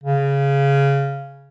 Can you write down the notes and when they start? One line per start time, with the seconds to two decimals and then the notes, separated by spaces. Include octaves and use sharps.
0.04 C#3